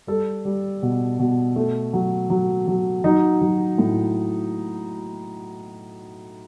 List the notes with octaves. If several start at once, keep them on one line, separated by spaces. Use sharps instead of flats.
G3 A4
G3
B2
B2
A3
F#3
F#3
F#3
F#3 D#4
F#3
A2